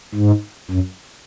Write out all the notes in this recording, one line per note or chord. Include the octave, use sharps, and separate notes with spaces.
G#2
F#2